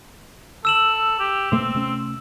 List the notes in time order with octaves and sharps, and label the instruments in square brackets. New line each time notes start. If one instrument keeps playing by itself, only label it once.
[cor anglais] A4 [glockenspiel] E6 E7 F#7
[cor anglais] G4
[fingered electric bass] B2 A3 A#3 [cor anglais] C4
[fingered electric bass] C3 A3 C#4